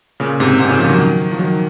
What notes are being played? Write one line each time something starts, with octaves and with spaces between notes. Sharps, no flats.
A#2 C#3
G#2 C3
G#2 C3
A#2 C#3
C#3 F3
D#3 F#3
F3
D#3 F#3